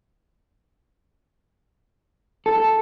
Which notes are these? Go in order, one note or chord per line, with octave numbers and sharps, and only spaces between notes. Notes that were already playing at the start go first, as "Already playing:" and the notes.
A4